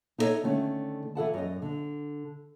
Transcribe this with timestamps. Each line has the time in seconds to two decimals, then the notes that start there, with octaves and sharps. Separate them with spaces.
0.18 D#4 E4 A4 C#5 D#5
0.43 D3 D#3 A3 C#4
1.15 E3 A4 F#5 A5
1.34 F#2 D#5
1.62 D3